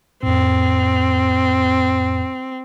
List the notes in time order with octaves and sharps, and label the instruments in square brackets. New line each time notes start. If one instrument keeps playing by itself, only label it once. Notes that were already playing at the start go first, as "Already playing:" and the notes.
[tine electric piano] F2 A2 [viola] C4